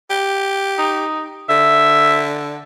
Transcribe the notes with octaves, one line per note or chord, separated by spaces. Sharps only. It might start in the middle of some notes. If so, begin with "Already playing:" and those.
G4
D#4
D3 E5